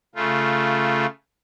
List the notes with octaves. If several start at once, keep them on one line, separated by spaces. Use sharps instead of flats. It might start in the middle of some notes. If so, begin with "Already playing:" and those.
C#3 A3 F4